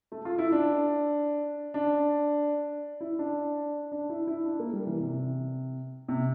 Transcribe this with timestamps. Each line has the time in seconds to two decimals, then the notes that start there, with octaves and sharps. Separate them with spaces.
0.12 A3
0.25 F4
0.39 E4
0.52 D4
1.74 D4
3.01 E4
3.19 D4
3.92 D4
4.10 E4
4.27 E4
4.46 D4
4.60 A#3
4.73 G3
4.87 E3
5.00 C3
6.09 C3